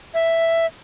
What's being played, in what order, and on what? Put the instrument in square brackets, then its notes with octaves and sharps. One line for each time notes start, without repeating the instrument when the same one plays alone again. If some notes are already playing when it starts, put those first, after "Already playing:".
[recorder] E5